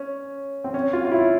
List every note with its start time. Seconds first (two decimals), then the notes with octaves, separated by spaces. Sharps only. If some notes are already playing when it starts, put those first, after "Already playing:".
Already playing: C#4
0.64 C4
0.74 C#4
0.93 F4
1.05 F4
1.12 E4